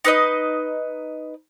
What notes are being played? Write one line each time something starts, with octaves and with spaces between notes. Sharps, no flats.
D#4 B4 D#5